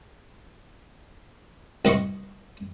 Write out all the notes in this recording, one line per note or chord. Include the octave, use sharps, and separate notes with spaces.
C2 B4 D#5 C6 C#6